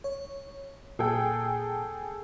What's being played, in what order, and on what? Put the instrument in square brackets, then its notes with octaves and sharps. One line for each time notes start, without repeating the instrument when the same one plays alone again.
[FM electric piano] C#5
[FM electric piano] A#2 [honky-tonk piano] G#4 A4 G5